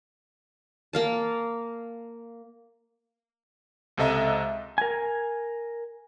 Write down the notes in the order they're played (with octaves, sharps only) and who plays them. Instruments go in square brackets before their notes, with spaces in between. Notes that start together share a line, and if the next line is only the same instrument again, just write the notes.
[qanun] A#3 F5 A5
[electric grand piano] C#2 C3 A4 D#5 E5 A#5
[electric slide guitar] A#4 G#5